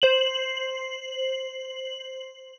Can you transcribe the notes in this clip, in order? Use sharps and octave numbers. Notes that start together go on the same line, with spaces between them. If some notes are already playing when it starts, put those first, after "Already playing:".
C5 F#7